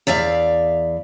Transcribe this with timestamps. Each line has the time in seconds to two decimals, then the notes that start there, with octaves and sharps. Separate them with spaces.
0.07 E2 D5 E5 F5